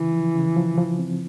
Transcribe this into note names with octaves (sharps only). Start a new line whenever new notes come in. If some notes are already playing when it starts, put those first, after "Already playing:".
Already playing: C#3 E3
F3
C#3
F3
F3
C4